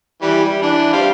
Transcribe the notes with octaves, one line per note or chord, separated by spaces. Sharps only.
E3 G3
G3
E3 D4
G3 C5 F5